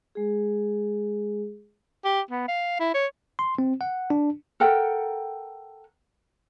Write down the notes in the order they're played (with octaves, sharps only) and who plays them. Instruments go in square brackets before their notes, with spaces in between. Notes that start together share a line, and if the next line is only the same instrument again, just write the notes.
[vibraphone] G#3 G#4
[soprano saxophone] G4
B3
F5
E4
C#5
[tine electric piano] C6
C4
F#5
D4
[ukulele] A4 A#4 F#5 G5